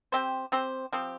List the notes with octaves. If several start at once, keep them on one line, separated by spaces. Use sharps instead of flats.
C4 G4 C5
C4 G4 C5
F3 C4 G4